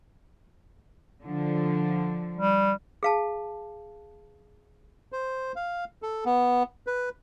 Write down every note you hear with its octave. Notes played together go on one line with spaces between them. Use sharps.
D3 F3
G3
G#4 F5 A5
C5
F5
A4
B3
B4